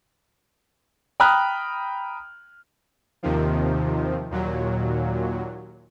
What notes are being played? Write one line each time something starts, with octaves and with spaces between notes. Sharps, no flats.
G5 A#5 B5 D#6 F6 F#6
D#2 C3 D#3 F3
D#2 A#2 F#3